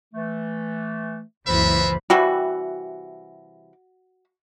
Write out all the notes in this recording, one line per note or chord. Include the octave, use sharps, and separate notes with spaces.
E3 A3
F#1 C#2 E3 F4 F#4 C5 E5 B5
C3 E3 G3 F#4